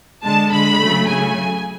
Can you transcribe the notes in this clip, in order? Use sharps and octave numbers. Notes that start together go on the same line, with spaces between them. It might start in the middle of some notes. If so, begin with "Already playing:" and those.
D3 G#3 A5
D3 G#3 B5
C#3 F#3 A3
C#3 F#3 A3 G#5